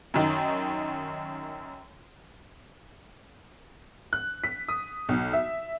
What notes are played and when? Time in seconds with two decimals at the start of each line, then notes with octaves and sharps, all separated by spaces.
0.14 F#2 D#3
4.13 F#6
4.44 B6
4.68 D#6
5.09 B1
5.33 E5